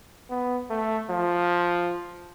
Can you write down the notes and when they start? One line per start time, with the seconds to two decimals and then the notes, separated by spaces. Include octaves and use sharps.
0.30 B3
0.70 A3
1.10 F3